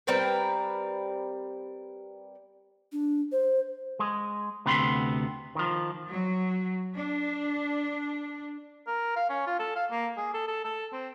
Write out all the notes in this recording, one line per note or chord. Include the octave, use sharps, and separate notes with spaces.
G3 C4 A#4 B4
D4
C5
G#3
D2 C3 B3 B5 C6
D#3 F3
F#3
D4
A#4
F5
C#4
F4
A4
F5
A#3
G#4
A4
A4
A4
C4